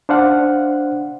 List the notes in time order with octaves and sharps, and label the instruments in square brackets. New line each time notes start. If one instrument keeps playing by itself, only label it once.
[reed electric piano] D4 C5 F5 F#5